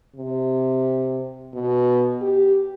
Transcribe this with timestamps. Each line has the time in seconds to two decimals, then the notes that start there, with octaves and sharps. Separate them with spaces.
0.16 C3
1.54 B2
2.21 G4